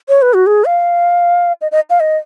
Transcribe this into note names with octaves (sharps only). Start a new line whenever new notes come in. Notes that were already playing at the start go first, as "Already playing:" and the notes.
C#5
B4
F#4
G#4
F5
D#5
D#5
F5
D#5